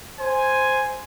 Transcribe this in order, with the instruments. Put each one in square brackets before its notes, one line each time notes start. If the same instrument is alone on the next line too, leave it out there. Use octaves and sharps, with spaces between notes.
[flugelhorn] C5 [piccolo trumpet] G#5